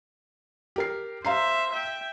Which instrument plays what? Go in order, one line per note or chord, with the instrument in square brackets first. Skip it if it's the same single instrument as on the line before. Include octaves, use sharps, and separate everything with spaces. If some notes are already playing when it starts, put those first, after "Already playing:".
[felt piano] G4 A#4 C7
[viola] C5 E5 [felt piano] F5 A#5 C7
[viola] E5 G5